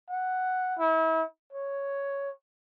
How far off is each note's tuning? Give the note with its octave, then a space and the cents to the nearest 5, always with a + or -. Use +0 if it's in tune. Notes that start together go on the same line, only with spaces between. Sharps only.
F#5 +0
E4 -35
C#5 +5